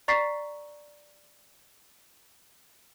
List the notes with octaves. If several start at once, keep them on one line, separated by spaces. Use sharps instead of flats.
D5 A#5 C#6 A6 B6 C7